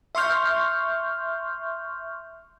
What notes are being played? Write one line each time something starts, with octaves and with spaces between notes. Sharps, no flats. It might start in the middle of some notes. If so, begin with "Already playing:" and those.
E5 C6 C#6 F6 G6